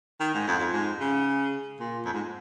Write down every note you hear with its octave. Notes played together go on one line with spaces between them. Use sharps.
D#3
G#2
F2
F2
G#2
C#3
A#2
F2
G#2